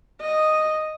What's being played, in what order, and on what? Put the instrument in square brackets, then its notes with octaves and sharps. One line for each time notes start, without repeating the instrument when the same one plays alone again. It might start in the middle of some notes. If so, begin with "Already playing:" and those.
[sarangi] D#5